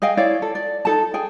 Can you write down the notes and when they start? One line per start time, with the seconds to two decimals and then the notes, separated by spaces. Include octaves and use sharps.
0.02 G#4 D#5 F5 G5
0.17 E4 C#5 D5 F5
0.42 A4
0.55 D5
0.85 D#4 A4 A5
1.14 G#4 G5